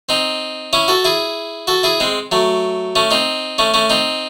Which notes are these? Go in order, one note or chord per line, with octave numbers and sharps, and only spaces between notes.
C4 D#4
C#4 E4
F#4 A4
E4 G#4
F#4 A4
E4 G#4
G#3 C4
F#3 A3
A3 C#4
C4 D#4
A3 C#4
A3 C#4
C4 D#4